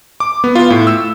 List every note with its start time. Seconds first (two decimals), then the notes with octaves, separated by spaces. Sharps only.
0.20 D6
0.44 B3
0.55 F4
0.70 A2
0.87 E6